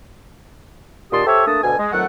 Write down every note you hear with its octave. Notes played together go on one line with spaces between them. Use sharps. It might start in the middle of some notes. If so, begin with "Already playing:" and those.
A#2 D#3 G4 A5 C6 D#6
G4 A4 C5 C#5 E5
A3 A#3 D4 A5 D#6
D2 B2 A4 G#5
G#3
F2 D#3 F#3 A3 F#5